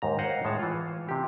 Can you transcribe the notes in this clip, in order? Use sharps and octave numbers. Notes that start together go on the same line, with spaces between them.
D#2 G#2 A#5
C5 C#5 D#5 F5 F#5 A#5
A2 G#3 C#5 A5
E3 F4
C3 G4